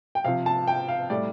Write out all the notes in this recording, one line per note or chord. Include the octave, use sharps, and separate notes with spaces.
G5
C3 F3 F5
A5
G5
F5
A2 G3 D5